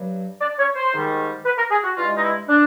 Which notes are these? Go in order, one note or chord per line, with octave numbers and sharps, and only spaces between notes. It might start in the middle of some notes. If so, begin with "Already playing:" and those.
Already playing: G2 F#3
D5
C#5
C5
G#2 D#3 G3
B4
A#4
G#4
F#4
G2 E3 G#3 F4
D#4
E4
D4